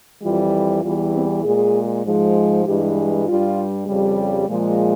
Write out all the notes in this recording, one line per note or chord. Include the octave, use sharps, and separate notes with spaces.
F2 E3 G3 F4
E2 E3 G3 F4
C4
A#2 G#3 G#4
G#2 F3 G#3
G2 E3 G#3 G4
G2 G3 F4
F2 C#3 G3
A#2 F3 G#3